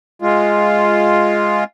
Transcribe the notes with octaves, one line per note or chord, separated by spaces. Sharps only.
G#3 F4